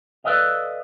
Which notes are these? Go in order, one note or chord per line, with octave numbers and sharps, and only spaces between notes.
A4 B4 D5 D#5 F5